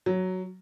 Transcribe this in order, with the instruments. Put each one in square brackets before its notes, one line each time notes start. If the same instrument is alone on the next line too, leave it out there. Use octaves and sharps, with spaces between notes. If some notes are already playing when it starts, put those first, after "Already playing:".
[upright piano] F#3